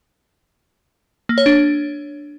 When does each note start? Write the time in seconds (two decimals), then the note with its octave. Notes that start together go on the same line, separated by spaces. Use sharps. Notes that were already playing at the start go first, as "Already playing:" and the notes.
1.29 A#3
1.38 C#5
1.46 D4